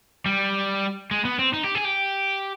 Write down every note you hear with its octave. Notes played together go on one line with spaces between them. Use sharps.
G3
G#3
B3
C4
D#4
G4
G#4
G4